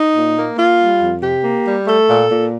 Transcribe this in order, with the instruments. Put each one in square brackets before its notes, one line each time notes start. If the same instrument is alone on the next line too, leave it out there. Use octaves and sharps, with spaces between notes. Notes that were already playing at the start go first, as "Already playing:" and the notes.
Already playing: [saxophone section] D#4
A#2
A#3
A#3 F4
G3
F2
C3 G4
A#3
G3
A3 A4
A#2
A#2